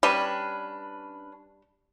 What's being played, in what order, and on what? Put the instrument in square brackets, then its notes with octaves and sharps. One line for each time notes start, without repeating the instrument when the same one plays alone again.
[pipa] G3 [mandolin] C#4 D4 B4